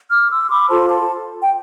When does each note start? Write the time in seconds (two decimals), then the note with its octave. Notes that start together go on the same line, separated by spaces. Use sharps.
0.10 D6 F6
0.30 C6 E6
0.49 B5 D6
0.69 F4 A4 C5 A5 C6
0.89 A5 C6
1.41 G5